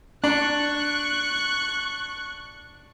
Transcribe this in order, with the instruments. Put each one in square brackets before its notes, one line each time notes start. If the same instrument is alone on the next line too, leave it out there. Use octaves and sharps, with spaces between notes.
[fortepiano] D4 [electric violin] C#6 F#6